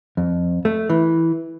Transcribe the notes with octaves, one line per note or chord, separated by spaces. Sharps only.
F2
A3
E3